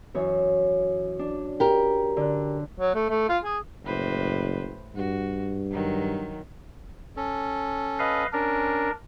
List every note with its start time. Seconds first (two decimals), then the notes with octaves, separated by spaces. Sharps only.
0.14 F#2 E3 C#5
1.19 D4
1.60 G4 A#4
2.17 D3 F#6
2.80 F#3
2.95 A3
3.09 A3
3.29 F4
3.44 G#4
3.85 F#1 A2 B4 C5
4.95 G2 F#4
5.71 D#3 F#3
7.17 C#4 A4
7.99 B4 D#5 F5
8.33 C#4 D4 A#4